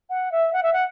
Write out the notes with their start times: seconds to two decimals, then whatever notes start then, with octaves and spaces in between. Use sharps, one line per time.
0.10 F#5
0.32 E5
0.53 F#5
0.63 E5
0.73 F#5